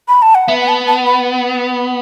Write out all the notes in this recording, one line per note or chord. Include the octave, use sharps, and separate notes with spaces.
B5
A5
F#5
B3 E5
F#5
A5
A5
B5